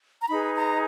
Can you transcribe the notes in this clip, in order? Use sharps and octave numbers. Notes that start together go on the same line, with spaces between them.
A#5
D#4 G#4 B4 B5
A#5